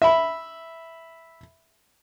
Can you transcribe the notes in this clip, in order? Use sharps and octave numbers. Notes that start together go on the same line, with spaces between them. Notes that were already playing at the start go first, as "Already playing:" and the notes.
E5 B5